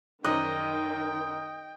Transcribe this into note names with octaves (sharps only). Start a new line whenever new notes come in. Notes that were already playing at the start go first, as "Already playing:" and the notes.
F#2 D#3 D#4 D#5 G5 F#6